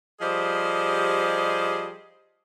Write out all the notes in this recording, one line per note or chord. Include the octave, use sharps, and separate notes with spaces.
F3 G3 G4 G#4 C5 D#5